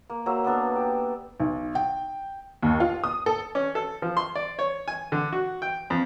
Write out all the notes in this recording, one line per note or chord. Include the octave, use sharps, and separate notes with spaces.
A#3
F#3 A#3 C5 E5
A#3 B3 D4 A4
G4
B1
G5
D#2
F4
D#6
A4
C#4
A4
F3
C6
D5
C#5
G#5
D3
F#4
G5
F2